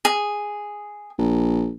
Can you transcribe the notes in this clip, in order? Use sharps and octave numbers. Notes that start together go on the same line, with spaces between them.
G#4
A#1